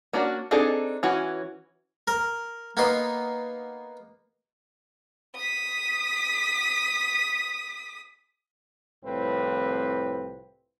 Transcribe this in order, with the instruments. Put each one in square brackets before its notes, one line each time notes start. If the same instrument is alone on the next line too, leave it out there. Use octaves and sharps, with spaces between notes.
[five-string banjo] A#3 C#4 D4 F#4
C4 D4 D#4 G#4 A4
E3 C#4 F#4
[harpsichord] A#4
A#3 B3 D#4 C6
[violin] D#6 B6
[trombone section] C2 A2 F3 C4 B4